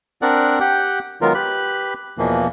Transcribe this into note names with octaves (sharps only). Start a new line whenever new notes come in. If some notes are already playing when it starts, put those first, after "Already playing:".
C4 D4 A#4 D5 F#5
G4 F#5 G5
D#3 F#3 G#3 B3 F4 A#4
G4 B4 B5
E2 B2 E3 F3 A#3